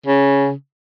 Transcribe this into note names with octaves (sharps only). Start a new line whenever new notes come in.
C#3